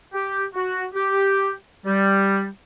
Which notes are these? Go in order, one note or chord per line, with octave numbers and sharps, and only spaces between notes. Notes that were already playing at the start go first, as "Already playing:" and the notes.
G4
F#4
G4
G3